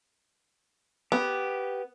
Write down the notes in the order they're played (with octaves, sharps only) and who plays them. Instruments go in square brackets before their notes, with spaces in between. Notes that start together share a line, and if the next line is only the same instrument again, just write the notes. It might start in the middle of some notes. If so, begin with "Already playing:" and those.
[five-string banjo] B3 [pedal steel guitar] G4